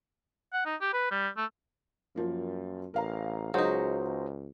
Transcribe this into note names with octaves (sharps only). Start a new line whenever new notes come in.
F#5
D#4
G4
B4
G3
A3
F#2 F3 A#3
A1 A#4 F5 A#5
C#2 F#3 D#4 F#4 G#4 C5